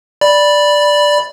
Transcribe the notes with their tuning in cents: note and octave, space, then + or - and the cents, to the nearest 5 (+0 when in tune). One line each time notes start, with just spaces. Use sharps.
D5 +0 B5 -10